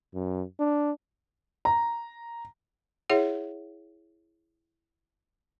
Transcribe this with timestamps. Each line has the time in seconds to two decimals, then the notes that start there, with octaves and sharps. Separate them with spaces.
0.14 F#2
0.59 D4
1.65 A#5
3.10 E4 G#4 C#5 E5 F#5